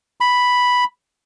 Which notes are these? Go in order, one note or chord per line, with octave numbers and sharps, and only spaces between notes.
B5